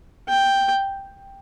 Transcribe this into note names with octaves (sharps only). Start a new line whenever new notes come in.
G5